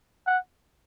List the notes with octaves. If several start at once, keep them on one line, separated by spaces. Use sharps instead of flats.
F#5